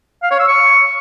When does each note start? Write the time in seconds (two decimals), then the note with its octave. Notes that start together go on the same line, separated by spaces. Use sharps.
0.23 F5
0.31 C#5
0.39 E6
0.48 C#6